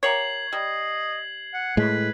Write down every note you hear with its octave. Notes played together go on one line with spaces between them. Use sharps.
A#3 G4 C#5 G#6 C7 F#7
G3 D#5
F#5
A2 G#3 B4